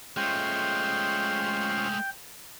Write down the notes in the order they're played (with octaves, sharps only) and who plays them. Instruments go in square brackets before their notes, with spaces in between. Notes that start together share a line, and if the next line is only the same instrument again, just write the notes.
[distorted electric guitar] G#3 A3 [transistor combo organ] C#4 F4 C5 [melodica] G5